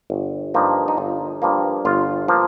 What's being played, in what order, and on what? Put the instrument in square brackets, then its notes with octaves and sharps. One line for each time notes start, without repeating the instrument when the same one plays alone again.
[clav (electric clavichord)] G1
G2 F3 A#3 D#4
D#4
G1 F4
G2 F3 A#3
G1 F4
F3 A#3